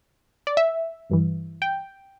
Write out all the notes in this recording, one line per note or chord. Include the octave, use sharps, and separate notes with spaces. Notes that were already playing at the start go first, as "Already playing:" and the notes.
D5
E5
G1 G2 E3
G5